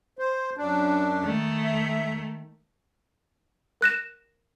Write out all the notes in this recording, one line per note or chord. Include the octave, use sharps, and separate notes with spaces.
C5
F#2 D4
D#3 A3
E5
A#4 F#6 A#6 E7